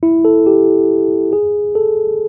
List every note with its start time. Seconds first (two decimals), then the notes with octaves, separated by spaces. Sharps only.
0.03 E4
0.25 A4
0.47 G4
1.33 G#4
1.75 A4